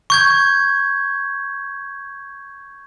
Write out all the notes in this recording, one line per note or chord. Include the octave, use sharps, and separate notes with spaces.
C#6 G6 G#6